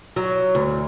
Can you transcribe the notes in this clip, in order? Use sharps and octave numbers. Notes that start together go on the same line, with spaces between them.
F#3
D2